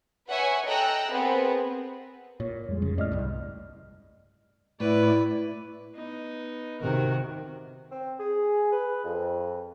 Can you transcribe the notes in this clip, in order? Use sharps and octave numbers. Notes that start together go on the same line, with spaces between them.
B4 C#5 E5 F#5 G#5 C#6
A4 D#5 G5 A#5 E6 F#6
B3 C4 G#4 A#4
A#2 C#5
F2 G3 G#3
C#3
A2 D5 D#5 F6
C2 G2
A2 E4 B4 D5
B3 D#4
C3 D#3 F#4 A#4
C4
G#4
B4
F2